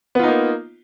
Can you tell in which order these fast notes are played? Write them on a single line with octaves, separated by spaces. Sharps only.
B3 F4 D#4 A#3